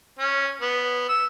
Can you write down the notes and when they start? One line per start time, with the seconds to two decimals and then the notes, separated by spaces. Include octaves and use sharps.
0.19 C#4
0.61 B3
1.09 E6